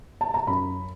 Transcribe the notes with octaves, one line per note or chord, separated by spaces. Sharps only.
A5
A#5
F#2 B5